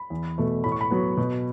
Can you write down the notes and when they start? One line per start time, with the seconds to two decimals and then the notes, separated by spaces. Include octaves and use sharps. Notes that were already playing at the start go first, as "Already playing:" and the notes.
Already playing: B5
0.10 E2
0.38 B2 A3
0.64 A2 B5
0.72 C#6
0.81 B5
0.90 F#3 B3
1.17 B2